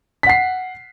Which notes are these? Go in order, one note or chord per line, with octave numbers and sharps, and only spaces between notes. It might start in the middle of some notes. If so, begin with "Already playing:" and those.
F#5 B6 C7